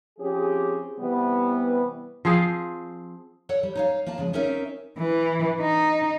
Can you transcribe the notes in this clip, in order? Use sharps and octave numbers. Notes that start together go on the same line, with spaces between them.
F3 C4 C#4 G4 G#4
C3 E3 G3 B3
F3 C4 G#4 F5
A4 C#5 D5 F#5
G3
D#4 C#5 F5
A#3 F4 D5 A5
C#3 F3 G#3
C4 C#4 D#4 F4 A#4 E5
E3
D#4